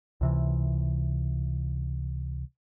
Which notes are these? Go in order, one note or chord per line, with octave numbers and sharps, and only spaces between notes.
C#2 C3 E3